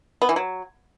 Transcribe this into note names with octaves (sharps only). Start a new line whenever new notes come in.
B3
E3
F#3